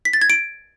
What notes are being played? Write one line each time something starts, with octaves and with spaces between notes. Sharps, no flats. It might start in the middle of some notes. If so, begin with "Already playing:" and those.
B6
A6
G#6
D7